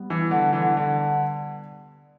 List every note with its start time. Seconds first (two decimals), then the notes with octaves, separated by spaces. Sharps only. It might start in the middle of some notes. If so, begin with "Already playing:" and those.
Already playing: G3 B3
0.10 E3
0.31 D3
0.53 E3
0.62 D3
0.77 D3